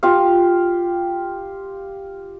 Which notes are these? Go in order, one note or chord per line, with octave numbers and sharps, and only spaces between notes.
F4 G4 F5